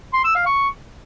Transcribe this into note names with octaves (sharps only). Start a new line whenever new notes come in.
C6
E6
F5
C#6